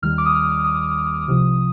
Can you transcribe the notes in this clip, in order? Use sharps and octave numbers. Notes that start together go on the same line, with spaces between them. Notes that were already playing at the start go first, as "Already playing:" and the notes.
D#2 D#3 G3 F6
D6
D#6
F6
D#6
C2 C3 F3